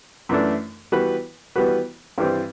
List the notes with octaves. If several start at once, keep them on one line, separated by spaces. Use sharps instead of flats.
F#2 E3 A3 D4
E3 G3 B3 F#4 B4
E3 G3 B3 F#4 B4
G2 E3 G3 C4